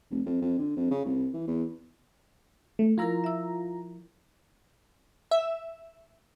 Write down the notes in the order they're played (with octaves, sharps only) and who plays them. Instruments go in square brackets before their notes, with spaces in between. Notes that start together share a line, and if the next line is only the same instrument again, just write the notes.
[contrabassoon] F1
F2
F2
D3
F2
C#3
C2
E3
E2
[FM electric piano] A3
[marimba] F3 E4 A#4 [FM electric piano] F4 A#5
[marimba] E5 E6
[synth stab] E5